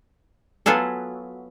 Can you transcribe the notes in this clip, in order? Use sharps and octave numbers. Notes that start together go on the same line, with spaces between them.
F#3 B3 F4 G#4 A4